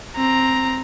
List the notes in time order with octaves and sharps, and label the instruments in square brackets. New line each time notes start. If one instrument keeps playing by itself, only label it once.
[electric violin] C4 A#5